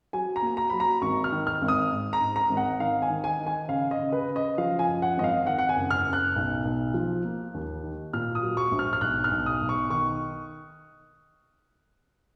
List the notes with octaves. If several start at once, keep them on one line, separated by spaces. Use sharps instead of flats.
F#3 G#5
A#5
A#3
A#5
F#3 B5
A#5
G#1 C#6
F6
D#3
F6
G#1
D#6
G#2
A#5
G#2
A#5
G#1
F#5
D#3 F5
G#5
D#3
G#5
D#3
G#5
C#3 F5
D#5
C#3
B4
C#3
D#5
F3 F5
G#5
F#2
F#5
G#1 D#5
F5
D#3 F#5
F#5
G#5
F#1
F6
F#1
F#6
B1
B1
F3
A#3
D#2
D#3
A#2 F6
D#6
F#3
C#6
A#1
F6
F6
B1 F#6
F6
B1
D#6
B1
C#6
D#3 C#6